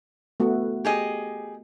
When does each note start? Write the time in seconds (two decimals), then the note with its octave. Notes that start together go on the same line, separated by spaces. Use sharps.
0.40 A3 B3 F#4
0.85 G4 G#4 D#5